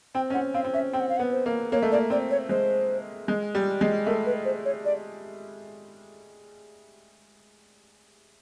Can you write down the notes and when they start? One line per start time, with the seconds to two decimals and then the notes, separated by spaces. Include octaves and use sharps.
0.15 C4 G5
0.30 C#4
0.34 C4 F#5
0.54 C4 F5
0.65 C4
0.73 C#4 E5
0.93 C4 G5
1.00 F#5
1.09 F5
1.17 B3 F#5
1.32 C5
1.46 A#3
1.72 A#3 C#5
1.83 A3
1.92 A#3 D5
2.10 C4 D5
2.31 C#5
2.49 G#3 C5
3.28 G#3
3.55 G3
3.81 G#3
4.07 A3 A#4
4.26 B4
4.45 C5
4.65 C#5
4.85 D5